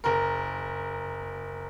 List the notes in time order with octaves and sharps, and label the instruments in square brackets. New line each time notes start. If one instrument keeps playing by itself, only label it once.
[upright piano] F#1 A#4